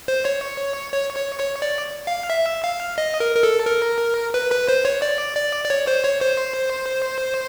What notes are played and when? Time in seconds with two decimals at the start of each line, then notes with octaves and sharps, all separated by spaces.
0.08 C5
0.25 C#5
0.94 C#5
1.16 C#5
1.40 C#5
1.62 D5
2.07 F5
2.30 E5
2.64 F5
2.98 D#5
3.20 A#4
3.36 A#4
3.43 A4
3.66 A#4
4.34 B4
4.51 B4
4.68 C5
4.85 C#5
5.02 D5
5.36 D5
5.65 D5
5.70 C#5
5.87 C5
6.04 C#5
6.21 C5